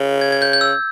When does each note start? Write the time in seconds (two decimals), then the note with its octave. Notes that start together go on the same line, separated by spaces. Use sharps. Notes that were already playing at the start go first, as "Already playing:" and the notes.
Already playing: C#3
0.21 G#6
0.32 G#6
0.42 G6
0.53 G6
0.61 E6